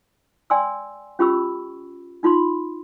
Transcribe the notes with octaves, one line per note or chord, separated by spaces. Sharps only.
D5 G5 G#5 C6 E6
C#4 F4 G4 B5 C#6 E6
D#4 F4 B5 C6